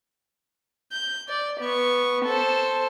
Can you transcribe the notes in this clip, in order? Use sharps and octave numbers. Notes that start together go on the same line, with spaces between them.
G6
D5
B3 C#6
A4 C5